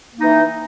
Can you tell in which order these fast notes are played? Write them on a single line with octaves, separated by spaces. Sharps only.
A#3 D#4 E3